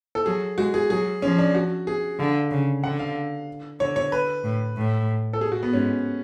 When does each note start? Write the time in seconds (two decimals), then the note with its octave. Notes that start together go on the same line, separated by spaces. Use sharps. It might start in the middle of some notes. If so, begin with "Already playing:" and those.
0.15 A4
0.26 F#3 G#4
0.58 G#3 F#4
0.74 G#4
0.90 F#3 G#4
1.22 F3 C#4
1.39 D4
1.55 F#4
1.87 G#4
2.19 D3 F5
2.51 C#3
2.83 D3 F#5
2.99 F5
3.79 D3 C#5
3.96 C#5
4.12 B4
4.44 A2
4.77 A2
5.33 A4
5.41 G#4
5.52 F#4
5.63 B3
5.73 G#2 C#4